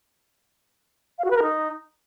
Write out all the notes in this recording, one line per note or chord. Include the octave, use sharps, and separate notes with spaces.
F5
F#4
B4
A#4
D#4